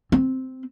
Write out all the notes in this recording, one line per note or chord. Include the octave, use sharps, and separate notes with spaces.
C4